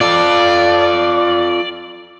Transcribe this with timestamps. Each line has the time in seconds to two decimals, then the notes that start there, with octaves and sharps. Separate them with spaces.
0.01 F4 A4 D5